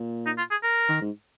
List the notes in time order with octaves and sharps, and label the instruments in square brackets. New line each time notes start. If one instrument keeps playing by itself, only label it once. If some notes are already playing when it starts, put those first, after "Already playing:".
Already playing: [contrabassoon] A#2
[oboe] D#4
F4
G#4
A#4
[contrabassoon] D#3
G#2